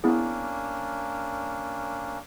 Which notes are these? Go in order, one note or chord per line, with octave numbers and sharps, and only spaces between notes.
A#3 B3 C#4 D4 E4 G#4